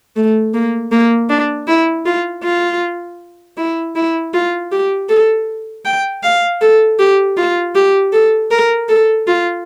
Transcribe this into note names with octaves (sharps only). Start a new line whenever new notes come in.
A3
A#3
A#3
D4
E4
F4
F4
E4
E4
F4
G4
A4
G5
F5
A4
G4
F4
G4
A4
A#4
A4
F4